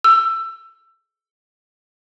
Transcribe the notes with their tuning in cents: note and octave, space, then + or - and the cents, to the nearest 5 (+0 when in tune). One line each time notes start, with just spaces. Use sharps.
E6 +20